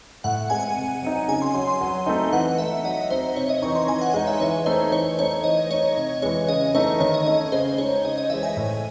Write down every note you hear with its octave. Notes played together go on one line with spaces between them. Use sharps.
A2 F#5
G#3 C4 G#5
C3
F#3 C4 D#4
C#3 G#5
C6
F#3 C#4 C6
C6
F#3
A3 C4 D#4
E3 F#5
A3 D#4 E5
F#3 D#5
C4 D#4 C5
C3 C#5
D#5
E3 C4 D#4 C#6
C6
E3 G#5
F#5
G#3 D#4 F#5
E5
E3 C#5
A3 D#4 C5
E3 C#5
A3 D#4 C#5
E3 D#5
A3 D#4 C#5
C3
E3 G#3 C#5
C#3 D#5
E3 A3 D#4 C#5
D#3 C#5
D#5
A3 C#4 D#5
C#3 C5
G#3 D#4 C#5
C#3 D#5
D#5
E3 G#3 E5
G#5
A2